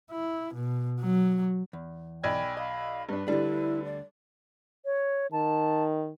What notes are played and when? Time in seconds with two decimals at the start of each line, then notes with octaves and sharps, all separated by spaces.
0.11 E4
0.54 B2
1.01 F#3
1.73 E2
2.24 B1 D5 G5 G#5 B5 G#6
2.57 D#5 F5 B5
3.09 G2 D4 B4
3.28 D2 D3 G3 D4 E4
3.84 D5
4.85 C#5
5.32 D#3 A5